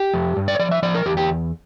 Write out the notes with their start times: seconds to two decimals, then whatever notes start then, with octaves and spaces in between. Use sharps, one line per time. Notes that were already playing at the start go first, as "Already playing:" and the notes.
Already playing: G4
0.14 F2
0.37 G2
0.48 D5
0.55 C#5
0.59 F3 D5
0.71 E5
0.83 F3 D5
0.95 A#4
1.06 E2 G4
1.17 G4